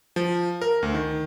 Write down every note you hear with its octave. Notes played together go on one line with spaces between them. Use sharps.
F3
A#4
D2
D#3